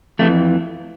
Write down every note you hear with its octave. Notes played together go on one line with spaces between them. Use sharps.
F2 E3 A3